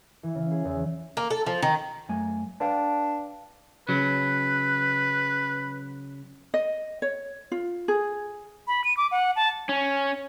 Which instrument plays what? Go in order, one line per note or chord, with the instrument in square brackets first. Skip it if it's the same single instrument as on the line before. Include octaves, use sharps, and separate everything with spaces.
[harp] E3
C#3
G#4
E2
[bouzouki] A#3
A4
F3
D#3
[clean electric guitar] F#2 A3 G#5
[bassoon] D4 [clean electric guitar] B4 F5 G5
[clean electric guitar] C#3 F#3 [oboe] B4
[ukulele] D#5
C#5
F4
G#4
[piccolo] B5
D#7
D6
F#5
A5
[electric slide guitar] C#4